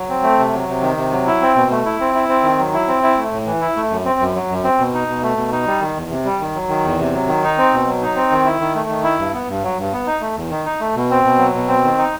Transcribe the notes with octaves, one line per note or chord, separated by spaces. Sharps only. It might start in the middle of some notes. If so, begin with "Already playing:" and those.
Already playing: F#3
C4
A3
C3
F#3
C3
D#3
C3
F#3
E4
C4
B2
A3
E4
C4
E4
C4
D#3
F#3
E4
C4
E4
A3
A2
E3
E4
A3
F#2
C4
F#2
F#3
F#2
C4
B2
D#4
B2
A3
B2
D#4
G3
D#3
E2
C3
G3
D#3
F#3
D#3
E2
C3
F#3
D#3
D#4
C4
B2
F#3
D#4
C4
D#3
E4
D#3
A3
D#3
E4
G2
B3
G2
F#3
G2
B3
D#4
A3
E2
D#3
D#4
A3
B2
C4
B2
F#3
B2
C4
D#3
D#4